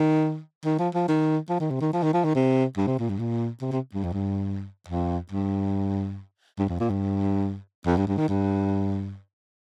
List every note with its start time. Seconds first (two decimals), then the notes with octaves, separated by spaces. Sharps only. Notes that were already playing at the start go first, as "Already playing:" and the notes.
Already playing: D#3
0.65 D#3
0.79 F3
0.94 F3
1.08 D#3
1.49 F3
1.60 D#3
1.71 C3
1.81 D#3
1.93 F3
2.03 D#3
2.14 F3
2.24 D#3
2.35 C3
2.77 G2
2.87 C3
2.99 A#2
3.10 G2
3.19 A#2
3.62 C3
3.72 C3
3.94 G2
4.04 F2
4.13 G2
4.89 F2
5.32 G2
6.59 G2
6.69 F2
6.80 A#2
6.90 G2
7.86 F2
7.97 G2
8.07 G2
8.17 D#3
8.29 G2